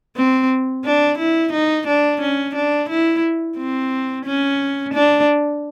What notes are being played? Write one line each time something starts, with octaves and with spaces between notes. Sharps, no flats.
C4
D4
E4
D#4
D4
C#4
D4
E4
C4
C#4
D4